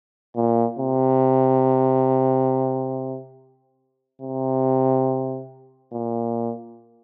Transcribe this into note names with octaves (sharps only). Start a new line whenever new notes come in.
A#2
C3
C3
A#2